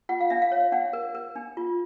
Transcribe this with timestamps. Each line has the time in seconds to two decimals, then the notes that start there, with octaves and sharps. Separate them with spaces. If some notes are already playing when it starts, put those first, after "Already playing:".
0.09 F4 F#5
0.21 F5
0.30 D4 E5
0.42 F5
0.52 C#5
0.72 D4 F#5
0.93 A#4
1.15 A#4
1.36 D4
1.57 F4